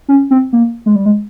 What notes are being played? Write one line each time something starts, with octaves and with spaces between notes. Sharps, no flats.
C#4
C4
A#3
G#3
G3
G#3